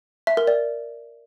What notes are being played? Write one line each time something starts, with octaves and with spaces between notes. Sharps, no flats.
E5
A#4
D5